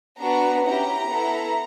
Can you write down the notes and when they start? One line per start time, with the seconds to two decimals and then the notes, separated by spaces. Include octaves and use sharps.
0.19 B3 D4 F#4 A#5
0.65 C#4 E4 G4 A#5
1.10 B3 E4 A4